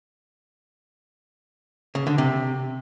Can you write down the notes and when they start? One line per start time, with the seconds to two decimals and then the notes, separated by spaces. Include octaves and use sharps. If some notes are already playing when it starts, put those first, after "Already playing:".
1.95 C#3
2.07 D3
2.18 C3